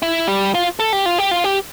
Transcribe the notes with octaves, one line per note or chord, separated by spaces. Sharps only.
E4
G3
F4
A4
G4
F4
G4
F4
G4